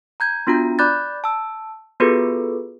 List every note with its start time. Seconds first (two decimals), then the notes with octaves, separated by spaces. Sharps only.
0.20 A#5 G6 G#6
0.47 B3 D4 F4 F#4 A#5
0.79 D5 B5 D6 F#6 G6 A6
1.24 A5 E6
2.00 B3 F4 F#4 G#4 A4 B4